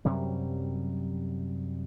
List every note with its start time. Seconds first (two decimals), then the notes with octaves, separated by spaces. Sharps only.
0.05 F#2 C3 F#3 G3